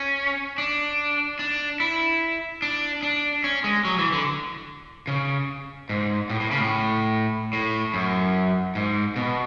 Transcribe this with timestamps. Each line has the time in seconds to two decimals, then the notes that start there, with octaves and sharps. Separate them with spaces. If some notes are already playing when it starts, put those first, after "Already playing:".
Already playing: C#4
0.58 D4
1.39 D4
1.80 E4
2.62 D4
3.03 D4
3.44 C#4
3.64 G#3
3.85 F#3
3.98 E3
4.13 D3
5.07 C#3
5.89 G#2
6.30 A2
6.40 A2
6.51 C#3
6.61 A2
7.53 A2
7.94 F#2
8.75 G#2
9.16 B2